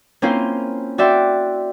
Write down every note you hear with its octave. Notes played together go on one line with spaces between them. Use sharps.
A#3 C4 C#4 E4 F4 C5
F#4 D5 E5 G5 C6